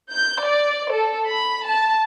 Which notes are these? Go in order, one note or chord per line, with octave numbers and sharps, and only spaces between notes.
G6
D5
A4
B5
A5